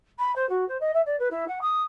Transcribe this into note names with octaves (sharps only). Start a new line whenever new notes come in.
B5
C5
F#4
C5
D#5
E5
D5
B4
E4
F#5
D#6